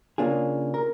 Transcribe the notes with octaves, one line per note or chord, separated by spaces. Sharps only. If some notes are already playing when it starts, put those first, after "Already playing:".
C#3 A#3 D4 F4 G#4
A#4